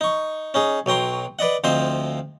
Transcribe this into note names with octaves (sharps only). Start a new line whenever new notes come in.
D#4 C#6
C#4 D#4 G#4
B1 F#3 G5 A#5 C6
B4 D5 D#5 F#5
D2 F3 C4 C5 D#5 C6